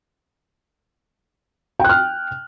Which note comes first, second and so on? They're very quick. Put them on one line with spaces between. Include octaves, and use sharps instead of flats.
G5 F#6 F6